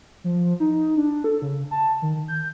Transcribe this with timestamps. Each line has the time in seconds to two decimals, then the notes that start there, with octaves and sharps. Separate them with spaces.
0.24 F3
0.60 D#4
0.97 D4
1.24 A4
1.42 C#3
1.71 A5
2.02 D#3
2.28 G6